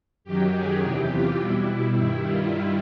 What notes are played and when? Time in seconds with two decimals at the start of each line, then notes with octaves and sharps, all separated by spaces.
0.24 F#2 D#3 F#3 G4
0.53 G#4
0.81 E2 C3 E3 G4
1.10 F4
1.38 B2 G3 E4
1.95 G2 D#3 G3 E4
2.23 F4